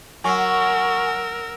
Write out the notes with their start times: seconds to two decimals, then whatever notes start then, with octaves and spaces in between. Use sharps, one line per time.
0.24 F#3 A#4 G#5 C#6 E6